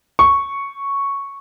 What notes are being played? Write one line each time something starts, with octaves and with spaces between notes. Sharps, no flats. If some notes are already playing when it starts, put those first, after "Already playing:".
C#6